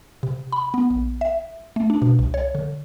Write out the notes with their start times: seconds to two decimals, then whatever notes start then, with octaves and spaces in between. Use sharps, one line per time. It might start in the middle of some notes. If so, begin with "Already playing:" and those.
0.23 C3
0.52 B5
0.74 B3
0.91 A#1
1.21 E5
1.76 A3
1.90 D4
2.02 B2
2.19 C2
2.34 C#5
2.55 D3